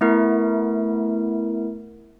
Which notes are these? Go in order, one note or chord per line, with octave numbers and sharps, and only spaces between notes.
A3 B3 E4 A#4